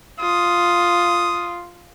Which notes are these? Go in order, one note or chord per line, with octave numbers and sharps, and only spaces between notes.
F4 D#6